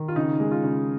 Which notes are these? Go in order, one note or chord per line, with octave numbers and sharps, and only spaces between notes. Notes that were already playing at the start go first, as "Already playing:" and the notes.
Already playing: D#3
F4
C#3 D#4
G#3
F4
C#3